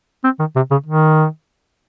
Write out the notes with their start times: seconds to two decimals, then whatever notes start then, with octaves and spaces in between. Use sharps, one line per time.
0.24 C4
0.39 D#3
0.56 C3
0.71 C#3
0.86 D#3